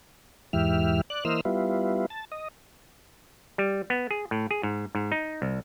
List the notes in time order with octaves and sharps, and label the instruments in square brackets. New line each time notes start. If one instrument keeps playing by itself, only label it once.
[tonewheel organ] E2 G#2 E3 G4 E5 F6
D5 F#6
E3 A#3 C5 D#5 E6 F6
G3 B3 E4 F4
A5
D#5
[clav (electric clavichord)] G3
B3
G#4
A2
G#4
G#2
G#2
D#4
C2